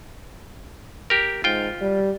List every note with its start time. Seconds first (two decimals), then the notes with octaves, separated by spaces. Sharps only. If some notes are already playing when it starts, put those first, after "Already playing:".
1.10 G4 A#4
1.44 G#2 F4 G5
1.82 G3